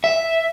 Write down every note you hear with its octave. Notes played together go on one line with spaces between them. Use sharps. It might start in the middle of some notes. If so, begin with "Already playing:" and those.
E5